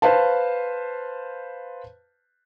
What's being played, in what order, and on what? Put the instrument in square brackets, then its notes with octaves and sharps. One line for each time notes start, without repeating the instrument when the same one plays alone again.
[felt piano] B4 C5 F5 A5